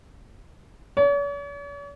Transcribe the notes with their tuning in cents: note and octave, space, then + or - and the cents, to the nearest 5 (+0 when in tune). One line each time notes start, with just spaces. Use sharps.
C#5 +45